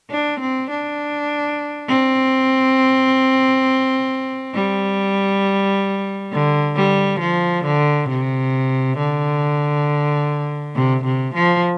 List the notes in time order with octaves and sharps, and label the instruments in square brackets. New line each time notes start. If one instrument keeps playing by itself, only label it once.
[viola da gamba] D4
C4
D4
C4
G3
D3
G3
F3
D3
C3
D3
C3
C3
F3